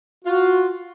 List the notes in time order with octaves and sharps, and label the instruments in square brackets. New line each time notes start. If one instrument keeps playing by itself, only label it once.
[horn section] F4 [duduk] F#4